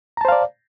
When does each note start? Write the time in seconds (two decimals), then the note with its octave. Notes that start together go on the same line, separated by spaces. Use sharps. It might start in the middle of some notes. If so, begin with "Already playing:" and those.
0.17 A#5
0.21 A5
0.25 C5
0.28 F5
0.32 D5